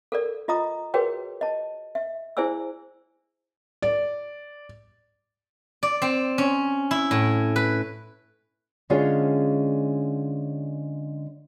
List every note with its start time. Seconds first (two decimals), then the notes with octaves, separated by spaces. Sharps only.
0.12 A4 A#4 D5
0.48 F4 D#5 A#5 D#6
0.94 F#4 G#4 A#4 B4 C#5 G5
1.41 D#5 A5
1.95 E5
2.37 E4 G#4 C5 D5 G#5 E6
3.82 D5
5.83 D5
6.02 C4
6.38 C#4
6.91 E4
7.11 A2
7.56 B4
8.90 D3 G#3 C#4 F4 G#4 C#5